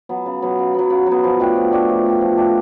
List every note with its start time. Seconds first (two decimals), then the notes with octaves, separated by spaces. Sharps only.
0.09 F#3 B3
0.26 C#3
0.42 F#3 B3
0.59 C#3
0.74 F#3 B3
0.90 C#3
1.07 F#3 B3
1.24 F3
1.40 A3 D4 G4
1.56 F3
1.72 A3 D4 G4
1.89 F3
2.05 A3 D4 G4
2.21 F3
2.38 A3 D4 G4